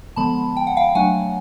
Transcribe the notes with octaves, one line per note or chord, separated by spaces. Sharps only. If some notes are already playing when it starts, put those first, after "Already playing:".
D3 F3 G#3 B3 A5 B5
G5
F#5
F5 G5
F#3 A3 D4 F#5 G#5